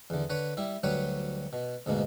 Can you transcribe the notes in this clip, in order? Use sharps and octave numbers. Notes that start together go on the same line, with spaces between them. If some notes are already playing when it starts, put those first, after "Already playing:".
E2 D3
D3 B4 C#5
G3 E4
D2 F#3 G3 B4 C#5
B2
D2 G#2 B2 A#3